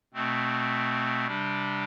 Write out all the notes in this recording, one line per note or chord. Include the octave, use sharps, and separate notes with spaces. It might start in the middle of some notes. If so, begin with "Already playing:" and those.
B2 A3 C4
C3 G3 D4